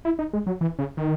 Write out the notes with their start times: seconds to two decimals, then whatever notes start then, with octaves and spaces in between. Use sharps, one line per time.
0.05 E4
0.19 D#4
0.33 G#3
0.47 F#3
0.61 E3
0.79 C#3
0.97 D#3